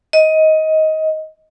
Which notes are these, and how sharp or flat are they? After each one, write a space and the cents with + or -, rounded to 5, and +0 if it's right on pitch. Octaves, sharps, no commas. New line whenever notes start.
D#5 +15